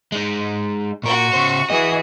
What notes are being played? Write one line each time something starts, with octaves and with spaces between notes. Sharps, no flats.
G#3 D#4
A#2 F#4 A#4 C#6
C#3 C5
E3 F#4 G#4 D#5